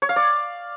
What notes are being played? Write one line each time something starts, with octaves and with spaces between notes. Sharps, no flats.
C#5
F5
D5